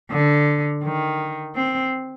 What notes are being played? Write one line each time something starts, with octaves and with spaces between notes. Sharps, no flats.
D3
D#3
C4